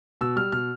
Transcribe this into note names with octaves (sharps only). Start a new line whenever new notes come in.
B2 E6
G3 F6
B2 F6